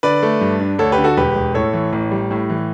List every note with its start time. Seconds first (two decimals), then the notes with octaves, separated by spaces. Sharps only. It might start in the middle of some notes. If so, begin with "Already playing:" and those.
0.03 D3 B4 D5
0.23 A3
0.41 G2
0.60 D4
0.79 D2 A4 C#5
0.92 G4 B4
0.98 D3
1.04 F#4 A4
1.17 E1 G4 B4
1.35 E1
1.54 A2 A4 C#5
1.73 E3
1.93 A1
2.11 G3
2.31 A2
2.49 E3